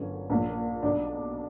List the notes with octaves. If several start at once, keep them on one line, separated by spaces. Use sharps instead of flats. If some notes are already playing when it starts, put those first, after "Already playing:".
Already playing: G1 F#2 D3 C#4
A#1 A#2
B1 B2 D4